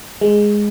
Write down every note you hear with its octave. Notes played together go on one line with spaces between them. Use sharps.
G#3